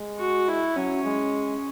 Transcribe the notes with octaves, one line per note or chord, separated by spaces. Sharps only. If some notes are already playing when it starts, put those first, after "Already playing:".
Already playing: G#3
F#4
E4
F#3 C#4
G#3